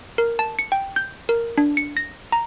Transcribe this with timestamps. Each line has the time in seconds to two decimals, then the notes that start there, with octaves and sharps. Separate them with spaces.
0.18 A#4
0.39 A5
0.59 C#7
0.72 G5
0.96 G6
1.29 A#4
1.58 D4
1.77 C#7
1.97 A#6
2.32 A#5